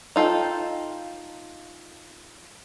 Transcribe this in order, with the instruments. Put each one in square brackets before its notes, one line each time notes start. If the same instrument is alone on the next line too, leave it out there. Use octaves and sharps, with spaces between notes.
[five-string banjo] D#4 F4 A4 G5